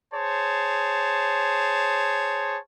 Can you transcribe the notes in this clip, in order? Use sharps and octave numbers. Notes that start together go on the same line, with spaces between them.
G#4 C5 C#5 A5